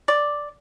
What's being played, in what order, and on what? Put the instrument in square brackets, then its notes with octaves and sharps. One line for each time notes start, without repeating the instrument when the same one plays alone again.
[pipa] D5